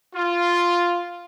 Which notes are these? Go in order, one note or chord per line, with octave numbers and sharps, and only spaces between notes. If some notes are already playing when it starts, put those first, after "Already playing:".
F4